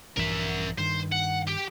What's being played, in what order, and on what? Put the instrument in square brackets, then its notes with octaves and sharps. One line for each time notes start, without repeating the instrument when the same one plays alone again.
[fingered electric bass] A#1 G2 E3 [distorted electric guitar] A#4 E5
[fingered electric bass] G2 D#3 [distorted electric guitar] C5
[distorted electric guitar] F#5
G4 G5